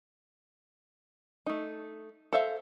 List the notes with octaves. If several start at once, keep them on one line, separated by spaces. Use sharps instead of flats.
A3 D#4
A4 C5 E5 F5